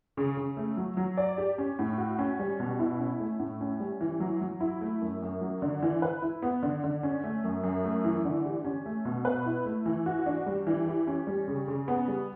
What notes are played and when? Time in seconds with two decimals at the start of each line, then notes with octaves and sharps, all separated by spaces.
0.17 C#3
0.37 C#3
0.57 A3
0.77 F#3
0.97 F#3
1.17 D5
1.38 G4
1.58 C#4
1.79 A2
1.98 F#4
2.19 C#4
2.40 G3
2.60 B2
2.79 E4
2.99 C#4
3.20 A3
3.39 A2
3.61 C#4
3.80 G3
4.01 E3
4.20 F#3
4.41 F#3
4.60 E4
4.81 A3
5.01 F#2
5.22 F#2
5.41 F#3
5.62 D3
5.83 E3
6.02 B4
6.22 E4
6.42 B3
6.63 D3
6.84 D3
7.03 C#4
7.24 A3
7.44 F#2
7.63 F#2
7.84 A3
8.04 E3
8.25 D3
8.45 G4
8.64 C#4
8.86 A3
9.05 B2
9.25 B4
9.46 E4
9.66 A3
9.86 E3
10.06 F#4
10.26 D4
10.46 G3
10.67 E3
10.87 G4
11.07 C#4
11.27 G3
11.48 C#3
11.68 C#3
11.88 B3
12.08 G3